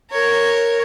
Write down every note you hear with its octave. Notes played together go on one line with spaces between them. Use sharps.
A#4 C#5